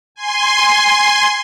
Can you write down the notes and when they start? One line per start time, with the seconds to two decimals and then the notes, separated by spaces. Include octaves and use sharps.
0.15 G#5 C6